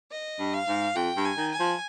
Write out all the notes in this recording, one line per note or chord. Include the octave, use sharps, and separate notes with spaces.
D#5
G2
F5
G#2
F2 G5
G2
G#5
D#3
G#5
F3